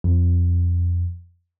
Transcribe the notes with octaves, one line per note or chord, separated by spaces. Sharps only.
F2